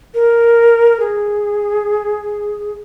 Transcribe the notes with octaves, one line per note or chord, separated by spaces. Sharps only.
A#4
G#4